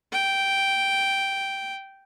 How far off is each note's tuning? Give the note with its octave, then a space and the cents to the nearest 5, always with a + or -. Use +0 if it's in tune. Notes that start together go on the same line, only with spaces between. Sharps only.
G5 -5